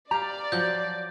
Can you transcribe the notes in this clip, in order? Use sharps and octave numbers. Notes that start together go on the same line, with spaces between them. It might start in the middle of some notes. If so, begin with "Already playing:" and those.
G4 D5 F5 A#5
F3 F#3 G6